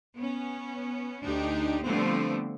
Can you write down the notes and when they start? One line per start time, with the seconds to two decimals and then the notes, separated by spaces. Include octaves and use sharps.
0.14 B3 C#4
1.22 D2 D4 D#4 G4
1.83 D3 F3 G3 A3 B3 C4